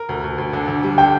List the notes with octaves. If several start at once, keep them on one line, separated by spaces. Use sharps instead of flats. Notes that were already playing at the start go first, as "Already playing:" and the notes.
Already playing: A#4
D2
D2
D2
D3
D3
G3
D3 G5